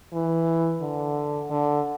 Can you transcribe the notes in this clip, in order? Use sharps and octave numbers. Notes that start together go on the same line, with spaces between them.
E3
D3
D3